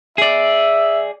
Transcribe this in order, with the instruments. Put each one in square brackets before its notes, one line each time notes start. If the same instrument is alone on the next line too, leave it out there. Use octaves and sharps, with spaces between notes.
[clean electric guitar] G#4 D5 [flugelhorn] E5